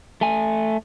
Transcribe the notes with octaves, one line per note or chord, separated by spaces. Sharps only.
A3 G#5